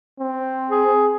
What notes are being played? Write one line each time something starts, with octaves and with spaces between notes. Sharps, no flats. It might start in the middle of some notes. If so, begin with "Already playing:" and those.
C4
G#4